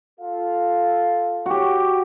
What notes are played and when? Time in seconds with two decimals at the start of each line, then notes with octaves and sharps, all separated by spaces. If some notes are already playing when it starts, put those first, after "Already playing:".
0.21 F4 A4 F5
1.46 F#4 G4